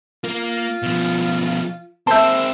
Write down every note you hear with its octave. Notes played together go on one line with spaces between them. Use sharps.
A#3 F4 A#4
B2 F3
G#3 A#3 C4 C5 E5 A5 G6